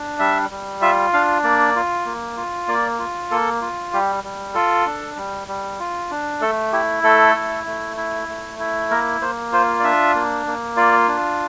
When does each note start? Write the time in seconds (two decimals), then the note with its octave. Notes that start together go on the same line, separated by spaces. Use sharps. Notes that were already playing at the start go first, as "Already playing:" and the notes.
Already playing: D4
0.19 G3 E5
0.50 G3
0.82 F4 E5
1.13 D4 F5
1.44 A#3 D5
1.76 F4
2.06 A#3
2.37 F4
2.68 A#3 D5
2.99 F4
3.31 A#3 A4
3.62 F4
3.93 G3 G4
4.24 G3
4.54 F4 A4
4.86 D4
5.17 G3
5.48 G3
5.80 F4
6.11 D4
6.41 A3 A4
6.72 E4 G4
7.04 A3 A4
7.35 E4
7.66 A3
7.97 E4
8.28 A3
8.59 E4
8.91 A#3 A#4
9.21 A#3 C5
9.52 F4 C5
9.80 D5
9.84 D4 E5
10.15 A#3
10.46 A#3
10.77 F4 D5
11.08 D4